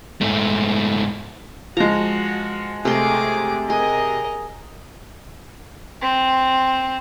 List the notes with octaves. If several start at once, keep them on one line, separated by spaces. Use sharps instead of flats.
G#2 A3
F3 G#3 F#4 A#5
C3 A3 G#4 A#4 C6 D6
G#4 A#4 D#5
C4